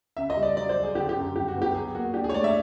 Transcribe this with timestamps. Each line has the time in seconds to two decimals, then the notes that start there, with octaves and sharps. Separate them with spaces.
0.17 C#3 E5
0.30 D#5
0.37 G3
0.43 D5
0.57 F#3 D5
0.69 C5
0.76 F#3
0.83 G#4
0.95 D3 G4
1.09 G4
1.16 F#2
1.36 G2 G4
1.48 F#4
1.56 B3
1.62 G4
1.74 F#3 G#4
1.95 A#3 F#4
2.14 D4 G4
2.24 G#4
2.29 C#5
2.34 A3 D5
2.44 E5